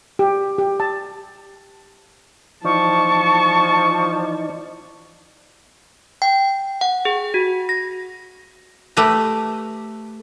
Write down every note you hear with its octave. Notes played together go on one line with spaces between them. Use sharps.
G4
G4
A5
E3 F3 D#4 D5 A5 C#6
G5
F#5
G#4
F#4
A#6
A3 G4 B4 A#5